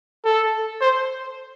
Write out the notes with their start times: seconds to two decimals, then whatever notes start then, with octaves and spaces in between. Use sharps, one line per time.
0.25 A4
0.81 C5